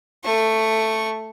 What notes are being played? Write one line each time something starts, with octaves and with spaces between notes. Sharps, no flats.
A3 C#6